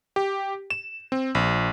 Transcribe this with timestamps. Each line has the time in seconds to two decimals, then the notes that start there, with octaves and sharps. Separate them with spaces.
0.16 G4
0.70 E7
1.12 C4
1.35 A#1